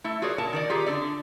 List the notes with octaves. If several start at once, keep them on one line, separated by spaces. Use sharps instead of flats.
A3 E4
F4 F#4 G#4 A#4 C#5 D5
A#2 A#4 A5
D#3 A#4 D5
F4 G4 G#4 A#5
D3 D4 A4 D5